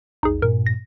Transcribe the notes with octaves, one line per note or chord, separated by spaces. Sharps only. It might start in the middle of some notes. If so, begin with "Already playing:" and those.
A#1 E2 D#4 G#4
G2 A#2 A#4
A#6